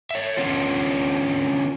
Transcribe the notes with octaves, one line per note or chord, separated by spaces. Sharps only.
C#5 E5
D3 B3 C#4 F4